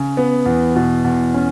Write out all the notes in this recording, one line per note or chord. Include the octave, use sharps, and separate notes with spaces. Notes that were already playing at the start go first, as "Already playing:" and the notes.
Already playing: C#3
B3
E2
B2
E2
C#4